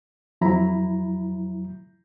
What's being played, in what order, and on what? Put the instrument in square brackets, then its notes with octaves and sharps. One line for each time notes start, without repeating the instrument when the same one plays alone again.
[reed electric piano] F2 F3 F#3 E4 A#5 B5